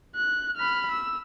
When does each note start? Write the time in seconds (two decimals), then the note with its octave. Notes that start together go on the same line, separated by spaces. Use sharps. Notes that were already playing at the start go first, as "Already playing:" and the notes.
0.15 F#6
0.57 B5 F6
0.91 E6